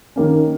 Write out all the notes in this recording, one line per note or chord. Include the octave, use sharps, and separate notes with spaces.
D#3 A#3 C#4